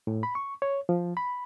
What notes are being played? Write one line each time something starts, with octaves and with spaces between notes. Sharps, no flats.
A2
B5
C#6
C#5
F3
B5